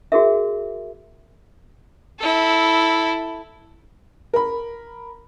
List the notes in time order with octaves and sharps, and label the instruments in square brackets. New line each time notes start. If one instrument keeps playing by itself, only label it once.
[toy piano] F#4 G#4 A#4 E5
[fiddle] E4 A4
[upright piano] A#4 B5